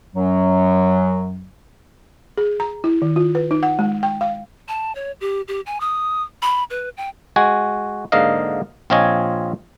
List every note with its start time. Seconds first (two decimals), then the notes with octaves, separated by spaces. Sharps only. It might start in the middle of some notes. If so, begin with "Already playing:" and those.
0.15 F#2 F#3
2.37 G#4
2.60 A#5
2.84 E4
3.02 D#3
3.16 F4
3.35 B4
3.51 D#4
3.63 F#5
3.79 G#3
4.03 G5
4.21 F5
4.68 A5
4.95 C#5
5.21 G4
5.48 G4
5.66 G#5
5.80 D#6
6.42 B5
6.70 B4
6.97 G5
7.36 G#3 F#4 G#5
8.12 G#2 D3 A#3 D#5 F5
8.90 A#1 C4 F4 C#5 D#5 G#5